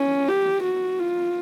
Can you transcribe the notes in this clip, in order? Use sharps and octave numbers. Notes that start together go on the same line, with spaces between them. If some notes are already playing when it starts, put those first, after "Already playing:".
Already playing: C#4
G4
F#4
F4